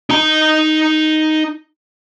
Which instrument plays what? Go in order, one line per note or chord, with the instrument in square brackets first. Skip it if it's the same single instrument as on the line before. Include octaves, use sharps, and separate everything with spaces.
[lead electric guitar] D#4 A#5